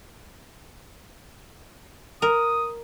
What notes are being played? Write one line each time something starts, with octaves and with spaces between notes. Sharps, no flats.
A#4 D#6